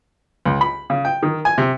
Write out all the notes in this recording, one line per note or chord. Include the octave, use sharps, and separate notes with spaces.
C#2
B5
C#3
G5
D#3
G#5
C3